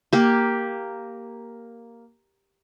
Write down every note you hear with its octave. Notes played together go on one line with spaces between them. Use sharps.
A#3 G4